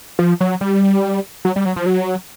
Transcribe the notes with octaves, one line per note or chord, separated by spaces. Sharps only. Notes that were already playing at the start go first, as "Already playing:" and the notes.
F3
F#3
G3
F#3
G3
F#3
F3
F#3